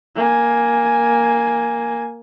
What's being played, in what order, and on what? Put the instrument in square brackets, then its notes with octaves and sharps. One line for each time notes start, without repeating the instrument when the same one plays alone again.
[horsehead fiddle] A#3 G#5